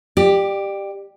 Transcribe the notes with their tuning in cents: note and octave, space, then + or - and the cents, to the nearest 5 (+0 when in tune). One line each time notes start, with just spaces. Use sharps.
G4 +5 D5 +30